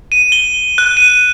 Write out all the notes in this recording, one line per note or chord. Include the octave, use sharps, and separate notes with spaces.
D#7
G7
F#6
D#7